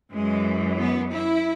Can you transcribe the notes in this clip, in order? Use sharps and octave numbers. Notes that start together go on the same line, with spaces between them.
F#2 E3 G#3
B3
E4